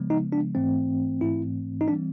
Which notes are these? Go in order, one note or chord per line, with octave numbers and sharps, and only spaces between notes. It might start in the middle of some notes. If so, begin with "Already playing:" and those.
Already playing: C#3 F3 G#3 B3
D#4
D4
G#2 E3 A3 C4
G#2 E3 A3 C4 E4
D#4
E3 G3 C4 D4